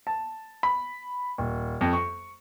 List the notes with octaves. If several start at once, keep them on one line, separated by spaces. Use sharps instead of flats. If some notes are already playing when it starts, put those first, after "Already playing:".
A5
B5
D#1
F2
C#6